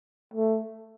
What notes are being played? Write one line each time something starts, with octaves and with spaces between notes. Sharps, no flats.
A3